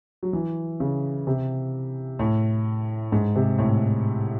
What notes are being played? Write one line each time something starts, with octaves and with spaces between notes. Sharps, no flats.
F#3
E3
C#3
C3
A2
G#2
C3
A2